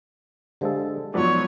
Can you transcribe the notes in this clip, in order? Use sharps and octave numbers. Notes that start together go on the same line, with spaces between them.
D3 G#3 G4 A4 C5 F5
G#2 F3 F#3 B3 C#5 D5